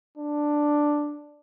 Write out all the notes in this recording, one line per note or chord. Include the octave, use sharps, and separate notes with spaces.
D4